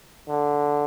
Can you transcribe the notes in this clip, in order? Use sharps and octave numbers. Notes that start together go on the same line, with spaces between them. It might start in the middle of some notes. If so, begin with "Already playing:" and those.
D3